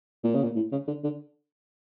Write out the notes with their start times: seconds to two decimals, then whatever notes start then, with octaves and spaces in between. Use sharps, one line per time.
0.24 A#2
0.35 C#3
0.44 A#2
0.56 A2
0.72 C#3
0.88 D3
1.04 D3